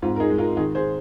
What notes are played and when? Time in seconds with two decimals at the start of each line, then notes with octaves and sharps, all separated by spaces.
0.02 G#2 C4 F4
0.16 A#4
0.20 D#4 G#4
0.30 G#3
0.38 F4 A#4
0.57 D#3 D#4 G#4
0.75 G#4 C5